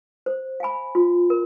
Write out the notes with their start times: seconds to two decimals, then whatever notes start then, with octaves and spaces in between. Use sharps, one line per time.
0.26 C5
0.60 F5 G#5 B5
0.95 F4
1.30 A#4